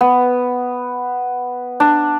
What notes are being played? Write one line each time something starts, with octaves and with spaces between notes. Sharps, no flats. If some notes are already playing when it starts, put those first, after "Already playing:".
B3
D4